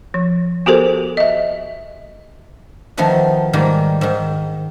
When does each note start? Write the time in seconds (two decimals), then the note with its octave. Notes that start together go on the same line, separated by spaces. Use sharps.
0.14 F3
0.66 B3 F#4 G4 A4 A#4 C5
1.17 D#5 E5
2.97 D#3 F3 A3 B3 F#4
3.53 G#2 D#3 G3 A#3
4.01 G#2 D#3